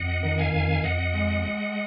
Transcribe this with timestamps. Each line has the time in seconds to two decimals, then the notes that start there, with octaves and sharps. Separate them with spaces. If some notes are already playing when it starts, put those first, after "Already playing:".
Already playing: F2 D#5 F#5
0.23 D#3
0.38 F5 G#5
0.53 F2
0.83 F2 D#5 F#5
1.14 G#3
1.43 G#3